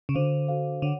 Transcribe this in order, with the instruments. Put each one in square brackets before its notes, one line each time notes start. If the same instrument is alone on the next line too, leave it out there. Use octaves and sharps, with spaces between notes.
[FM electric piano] C#3
[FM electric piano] D3 [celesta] F#4 A4 C5 F5
[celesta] F#4 A4 C5 F5
[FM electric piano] D3 [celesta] C#5 F#5